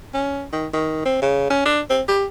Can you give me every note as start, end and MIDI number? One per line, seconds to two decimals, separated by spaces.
0.14 0.44 61
0.53 0.67 51
0.73 1.01 51
1.05 1.18 60
1.22 1.46 49
1.51 1.62 61
1.66 1.81 62
1.90 2.02 60
2.08 2.25 67